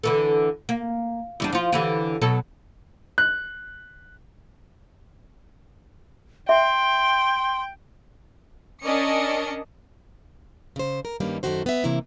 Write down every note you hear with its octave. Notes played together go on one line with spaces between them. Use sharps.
D3 E3 A4
A#3
E2 G3 D4
F3 F4
D3 E3 G4
B2 F#3 A4
F#6
E5 G5 C6
C#4 D4 A#4 D5 D#5 C#7
C#3 C5
A#4
G2 D#3 G3 A#3 C#4
F#2 D3 D#3 A3 F#4 C5
B3 E5
C3 E3 A#3 E4